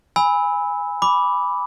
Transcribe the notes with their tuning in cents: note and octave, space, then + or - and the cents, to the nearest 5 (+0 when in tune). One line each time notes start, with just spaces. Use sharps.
G#5 -15 B5 +0 E6 -20
B5 +0 D6 -10